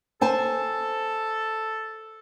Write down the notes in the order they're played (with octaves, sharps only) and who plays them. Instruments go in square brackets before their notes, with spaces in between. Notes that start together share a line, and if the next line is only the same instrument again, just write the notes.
[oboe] A4 [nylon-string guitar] C5 G#5 A5